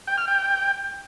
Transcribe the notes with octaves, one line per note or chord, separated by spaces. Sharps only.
G5
F6
G5